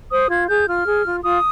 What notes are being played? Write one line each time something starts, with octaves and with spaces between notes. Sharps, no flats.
C5 D#6
F4 G#6
G#4 G6
F4 F6
G#4
F4
F4 D#6